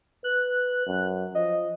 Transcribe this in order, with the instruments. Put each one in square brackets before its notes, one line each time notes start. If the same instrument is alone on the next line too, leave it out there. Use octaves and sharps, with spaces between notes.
[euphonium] B4 [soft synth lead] F#6
[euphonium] F#2
[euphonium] F3 [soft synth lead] D#5